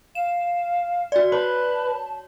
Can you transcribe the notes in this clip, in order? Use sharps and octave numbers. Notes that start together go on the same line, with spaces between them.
F5 E7
F#4 D5
B4 C#5 A5